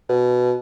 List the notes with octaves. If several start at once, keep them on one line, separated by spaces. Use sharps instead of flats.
B2